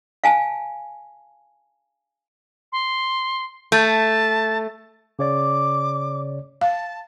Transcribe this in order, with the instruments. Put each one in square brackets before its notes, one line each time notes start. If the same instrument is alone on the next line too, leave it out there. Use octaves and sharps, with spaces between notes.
[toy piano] F5 G#5 A5
[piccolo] C6
[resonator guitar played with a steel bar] A3 [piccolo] A5
[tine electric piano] C#3 C#5 D5 [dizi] D6
[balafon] F5 [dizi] A5